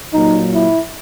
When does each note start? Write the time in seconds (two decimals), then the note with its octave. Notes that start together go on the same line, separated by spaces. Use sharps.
0.13 A#2 F#3 A#3 D#4
0.51 E4